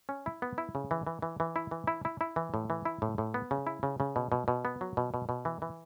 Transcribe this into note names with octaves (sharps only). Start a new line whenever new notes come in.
C#4
E4
B3
E4
C#3
E3
E3
E3
E3
E4
E3
E4
E4
E4
E3
A2
E3
E4
A2
A2
B3
C#3
E4
C#3
C#3
B2
B2
B2
B3
F#3
B2
B2
B2
E3
E3